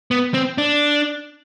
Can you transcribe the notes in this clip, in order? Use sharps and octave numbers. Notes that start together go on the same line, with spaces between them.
B3
C4
D4